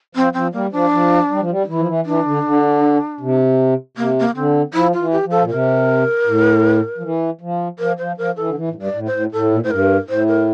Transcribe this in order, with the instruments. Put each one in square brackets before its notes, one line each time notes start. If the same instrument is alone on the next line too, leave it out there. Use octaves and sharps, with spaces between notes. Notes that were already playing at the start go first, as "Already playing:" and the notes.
[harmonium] F3 [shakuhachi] C4
[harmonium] F3 [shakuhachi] C4
[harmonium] G3 [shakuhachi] A#3
[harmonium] F3 [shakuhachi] D4
[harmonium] F3
G3
F3
G3
[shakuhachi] D4
[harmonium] E3 [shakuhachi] E4
[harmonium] F3
E3
[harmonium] E3 [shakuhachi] D4
[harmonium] D3
D3
C3
[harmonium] C3 [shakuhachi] A#3
[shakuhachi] A#3
[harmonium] D3 [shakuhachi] C4
[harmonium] F3 [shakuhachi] E4
[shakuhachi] F4
[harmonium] E3
[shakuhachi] G4
[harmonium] F3
[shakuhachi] A4
[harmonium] A#2
[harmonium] C3 [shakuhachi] A#4
[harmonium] A2
F3
E3
F3
[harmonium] F3 [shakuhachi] A#4
[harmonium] F3 [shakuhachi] C5
[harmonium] F3 [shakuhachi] A#4
[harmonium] E3 [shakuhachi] A4
[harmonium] D3
E3
A2
G2
[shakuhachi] D5
[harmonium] A2
[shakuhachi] C5
[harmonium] A2
[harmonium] A2 [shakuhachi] A4
[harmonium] A#2
[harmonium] A2 [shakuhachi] C5
[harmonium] G2 [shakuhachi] A#4
[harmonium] A2 [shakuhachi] C5
[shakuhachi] A#4